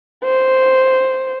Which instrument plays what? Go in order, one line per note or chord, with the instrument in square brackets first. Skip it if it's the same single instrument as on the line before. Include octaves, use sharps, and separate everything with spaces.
[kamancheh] C5